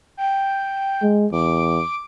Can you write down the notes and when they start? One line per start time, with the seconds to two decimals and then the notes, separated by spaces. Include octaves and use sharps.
0.17 G5
1.02 G#3
1.32 E2 D6